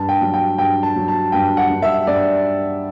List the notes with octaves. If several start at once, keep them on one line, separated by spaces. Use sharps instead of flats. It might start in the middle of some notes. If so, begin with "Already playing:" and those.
Already playing: G2 A5
G5
F#3
G5
G2 G5
A5
F#3
A5
G2 G5
F#5
G2
E5
G2 D5